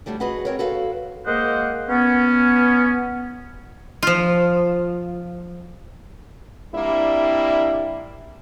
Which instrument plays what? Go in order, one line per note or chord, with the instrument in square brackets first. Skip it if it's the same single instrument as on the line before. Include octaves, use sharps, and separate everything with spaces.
[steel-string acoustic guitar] D3 F#3 G3 A3 D4
F#4 G#4 B4 D#5 F#5
C4 A#4 C#5
F#4 A4 B4 F5
[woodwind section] G#3 A#3 A#4 C5 D#5 F#5
B3 C#4
[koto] F3 F4
[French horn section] G3 A#3 C4 D4 E4